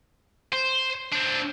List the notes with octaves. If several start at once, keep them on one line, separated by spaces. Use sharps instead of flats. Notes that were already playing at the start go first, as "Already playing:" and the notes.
C5
C4 D4